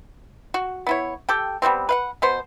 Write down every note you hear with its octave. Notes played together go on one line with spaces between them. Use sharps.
F#4
B3 E4 C#5
G4 A4 G5
G3 G#3 B3 C4
B4 F5 F#5
B2 B3 C5